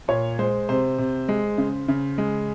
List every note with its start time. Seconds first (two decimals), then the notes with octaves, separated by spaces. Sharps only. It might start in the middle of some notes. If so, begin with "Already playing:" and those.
0.08 A#2 C#5
0.39 G#3 C5
0.69 C3 C5
0.99 C3
1.28 G#3
1.58 C#3
1.88 C#3
2.18 G#3